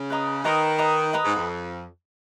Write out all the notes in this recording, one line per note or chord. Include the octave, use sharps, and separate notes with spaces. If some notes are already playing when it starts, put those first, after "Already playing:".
Already playing: C#3
B4 D#5 A#5 D#6
D#3 B4 D#5 A#5 D#6
B4 D#5 A#5 D#6
B4 D#5 A#5 D#6
G#2
F2